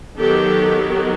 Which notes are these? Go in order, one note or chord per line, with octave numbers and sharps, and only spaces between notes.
D#3 F#3 B3 G4 A4